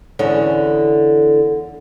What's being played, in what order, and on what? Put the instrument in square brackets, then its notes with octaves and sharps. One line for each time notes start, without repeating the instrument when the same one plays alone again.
[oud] E2 D3 C#4